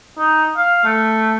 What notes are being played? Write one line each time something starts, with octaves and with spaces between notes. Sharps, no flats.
D#4
F5
A3